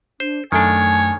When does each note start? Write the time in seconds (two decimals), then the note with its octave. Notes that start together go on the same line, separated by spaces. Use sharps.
0.20 D4 C5
0.52 F#2 D#3 A3 D4 C#5 G#5 A5